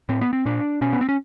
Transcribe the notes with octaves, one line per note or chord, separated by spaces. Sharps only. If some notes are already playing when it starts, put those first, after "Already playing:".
A2 C4
B3
C4
A#2 D4
B2 C#4
B3
C4
C#4